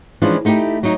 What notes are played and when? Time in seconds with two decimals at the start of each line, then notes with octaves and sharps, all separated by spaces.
0.22 E3 F3 G#3 C#4 D4 F4
0.45 A3 D#4 E4 F#4 G4
0.83 F#3 D#4